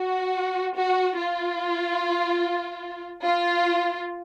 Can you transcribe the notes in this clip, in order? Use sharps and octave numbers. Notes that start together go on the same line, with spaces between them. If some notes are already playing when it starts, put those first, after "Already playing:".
Already playing: F#4
F#4
F4
F4